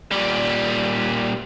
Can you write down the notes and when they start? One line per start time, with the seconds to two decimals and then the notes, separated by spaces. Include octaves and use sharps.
0.11 A#2 G3